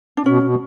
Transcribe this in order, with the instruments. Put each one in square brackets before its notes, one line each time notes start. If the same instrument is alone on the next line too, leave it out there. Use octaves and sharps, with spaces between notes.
[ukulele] D4
[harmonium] B2 [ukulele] C#4
[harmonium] B2